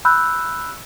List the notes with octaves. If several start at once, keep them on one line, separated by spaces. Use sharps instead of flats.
B5 E6 F#6 G6